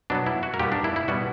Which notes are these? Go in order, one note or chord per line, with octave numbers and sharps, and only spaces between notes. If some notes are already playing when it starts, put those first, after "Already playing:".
B2 F#3 B3 D4
E4
F#4
A#4
A#2 G3 B3 G4
D4
E4
E4
B2 G3 B3 F#4